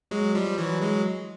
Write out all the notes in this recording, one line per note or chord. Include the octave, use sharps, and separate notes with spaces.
F#3 G#3
F3 G3
E3 F#3
F#3 G#3